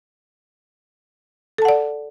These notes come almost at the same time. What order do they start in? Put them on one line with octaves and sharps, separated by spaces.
A4 A5 F#5 D5